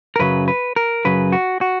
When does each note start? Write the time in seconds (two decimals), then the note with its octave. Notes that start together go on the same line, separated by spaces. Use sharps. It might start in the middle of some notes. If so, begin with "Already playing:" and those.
0.16 A#4
0.19 F#2 C#3 F#3 B4
0.48 B4
0.76 A#4
1.05 F#2 C#3 F#3 B4
1.32 F#4
1.61 F#4